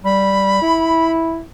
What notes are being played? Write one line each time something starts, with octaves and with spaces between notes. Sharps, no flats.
G3 B5
E4